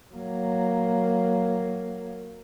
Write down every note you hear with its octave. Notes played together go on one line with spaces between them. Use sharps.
F#3 A#3